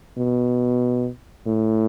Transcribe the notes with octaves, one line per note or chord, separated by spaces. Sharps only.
B2
A2